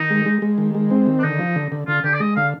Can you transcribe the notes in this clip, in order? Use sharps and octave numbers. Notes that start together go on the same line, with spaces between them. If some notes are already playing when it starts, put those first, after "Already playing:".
Already playing: D#3 D#4
G#3
G#3
G#3
D#3
G#3
C4
D#3
D4
D3 D#4
F3
D3
D3
D3 F4
D3 G4
D5
G#3 D#5
D3 F5